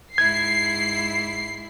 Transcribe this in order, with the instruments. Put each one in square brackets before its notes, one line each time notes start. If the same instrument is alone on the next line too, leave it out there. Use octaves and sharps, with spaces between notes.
[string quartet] G#2 E4 [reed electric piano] G#6 [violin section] C7